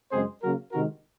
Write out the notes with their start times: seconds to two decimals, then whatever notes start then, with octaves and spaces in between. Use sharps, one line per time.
0.11 F#2 C#3 G#3 C4 G#4 C5
0.41 C#3 F#3 A#3 F#4 A#4
0.72 C3 D#3 G#3 F#4 A#4